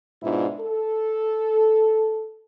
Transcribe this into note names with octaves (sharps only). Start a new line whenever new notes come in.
G#2 B2 D4 E4 F4
A4